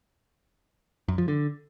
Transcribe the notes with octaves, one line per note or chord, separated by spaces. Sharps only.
F#2
F3
D3